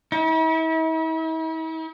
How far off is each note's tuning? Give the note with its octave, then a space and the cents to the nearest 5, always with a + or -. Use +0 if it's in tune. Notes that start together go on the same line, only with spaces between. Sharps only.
E4 -45